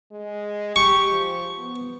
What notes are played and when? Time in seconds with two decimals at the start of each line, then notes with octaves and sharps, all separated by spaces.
0.11 G#3
0.76 G4 C#6
1.11 F3
1.58 B3